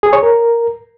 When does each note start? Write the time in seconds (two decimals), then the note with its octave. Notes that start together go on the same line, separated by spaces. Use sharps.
0.03 G#4
0.13 C#5
0.23 A#4